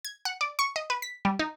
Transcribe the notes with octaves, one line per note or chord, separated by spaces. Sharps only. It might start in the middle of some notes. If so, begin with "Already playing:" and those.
G#6
F#5
D5
C#6
D#5
B4
B6
G3
D#4